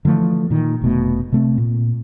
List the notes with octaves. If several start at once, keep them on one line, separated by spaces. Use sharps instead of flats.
D3 E3 F3 A3
A#2 D#3
F1 B2 A3
C3 A3 C4
A#2